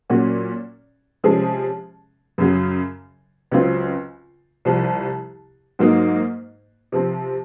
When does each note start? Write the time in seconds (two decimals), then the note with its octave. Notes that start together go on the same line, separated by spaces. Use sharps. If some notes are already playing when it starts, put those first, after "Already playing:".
0.10 A#2 F#3 C#4 F#4
1.24 C3 F3 G#3 C#4 G#4
2.38 F#2 C#3 F#3
3.51 C#2 C#3 F#3 C4 F4
4.65 C2 C3 F3
5.79 G#2 F#3 A#3 D#4
6.92 C3 F3 C4